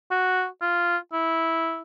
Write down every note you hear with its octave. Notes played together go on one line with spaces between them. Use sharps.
F#4
F4
E4